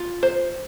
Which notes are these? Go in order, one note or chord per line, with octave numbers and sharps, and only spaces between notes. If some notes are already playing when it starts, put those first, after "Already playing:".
Already playing: F4
C5